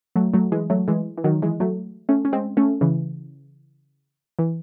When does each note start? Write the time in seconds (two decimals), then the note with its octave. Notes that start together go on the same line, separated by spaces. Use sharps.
0.16 F#3 A3
0.34 F#3 A3
0.52 E3 G#3
0.70 F#3 A3
0.88 E3 G#3
1.18 E3
1.24 D#3 F#3
1.42 E3 G#3
1.60 F#3 A3
2.09 A3 C#4
2.25 C#4
2.33 G#3 C4
2.57 A3 C#4
2.81 C#3 E3
4.39 E3